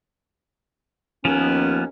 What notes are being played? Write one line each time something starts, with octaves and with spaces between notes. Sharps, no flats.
D#2 F3 A#3 B3 C#4